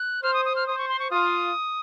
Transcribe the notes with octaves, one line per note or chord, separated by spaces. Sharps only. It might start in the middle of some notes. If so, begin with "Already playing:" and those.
Already playing: F#6
C5 F6
D#6
D#6
F6
C5 D#6
C#6
C6
C#6
F4 D#6